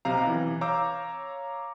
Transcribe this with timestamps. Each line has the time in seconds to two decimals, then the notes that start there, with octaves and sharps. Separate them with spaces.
0.05 B1 C3 G4 F5 A#5
0.27 E3
0.61 C#5 F5 A#5 D6 E6 G6